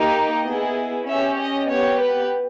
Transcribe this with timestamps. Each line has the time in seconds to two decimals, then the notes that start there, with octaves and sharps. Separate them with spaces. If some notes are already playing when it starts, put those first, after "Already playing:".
Already playing: A#3 D#4 G4
0.12 D#5
0.43 B3 E4 G#4
1.06 C#4 G4 E5
1.38 D#5
1.69 B3 G4 C#5
2.01 B4